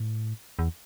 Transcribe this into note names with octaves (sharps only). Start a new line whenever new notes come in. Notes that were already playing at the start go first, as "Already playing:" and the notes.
Already playing: A2
E2